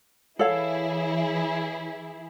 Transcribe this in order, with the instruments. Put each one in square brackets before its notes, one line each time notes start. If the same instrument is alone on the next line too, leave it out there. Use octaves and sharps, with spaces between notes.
[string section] E3 E4 G#4 [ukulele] A4 C#5 F5